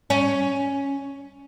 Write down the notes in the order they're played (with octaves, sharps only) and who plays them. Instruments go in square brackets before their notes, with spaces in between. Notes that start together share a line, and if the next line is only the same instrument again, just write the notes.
[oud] C#4